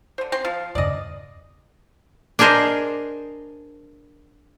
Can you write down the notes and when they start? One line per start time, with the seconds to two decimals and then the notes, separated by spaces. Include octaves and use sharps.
0.18 D3 C5
0.32 C4 C6
0.45 F3 F6 A6 C7
0.75 E2 G2 C#3 D5 D#5
2.39 D4 G#4 A#4 C5 D#5